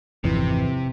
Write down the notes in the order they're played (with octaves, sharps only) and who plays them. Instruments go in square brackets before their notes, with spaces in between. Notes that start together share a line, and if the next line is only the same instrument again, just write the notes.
[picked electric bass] G#1 F2 E3 [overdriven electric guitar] C3